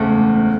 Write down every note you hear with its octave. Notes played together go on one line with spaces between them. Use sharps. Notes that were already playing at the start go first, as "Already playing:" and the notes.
Already playing: F#1 E2 C#3 G#3 A3 C4